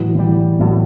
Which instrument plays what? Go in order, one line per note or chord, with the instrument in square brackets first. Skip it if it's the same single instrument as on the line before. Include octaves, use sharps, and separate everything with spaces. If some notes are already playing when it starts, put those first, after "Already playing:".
Already playing: [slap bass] A2 [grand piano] E3 F#3
[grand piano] E3 [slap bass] G3
[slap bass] A2 [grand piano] F#3